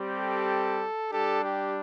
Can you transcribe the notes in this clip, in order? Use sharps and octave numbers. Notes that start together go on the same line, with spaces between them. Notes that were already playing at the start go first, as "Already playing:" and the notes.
Already playing: G3 C4 G4
A4
G3 D4 G4 A4
G4